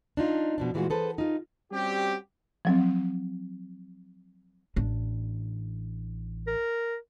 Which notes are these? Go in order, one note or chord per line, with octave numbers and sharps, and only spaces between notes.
D4 D#4 F4
B2 F3 D4
A#2 E3 G#3 A3 F4 F#4
G#4 A4 B4 C5
D#4 F4
G3 C4 C#4 F#4 G4
F3 F#3 C4
A1 D4
A#4